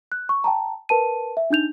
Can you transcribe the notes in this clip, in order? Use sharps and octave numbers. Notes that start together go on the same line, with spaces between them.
F#6
C#6
G5 A5 A#5
A#4 B4 A5 D#7
E5
D4 D#4 G6 F7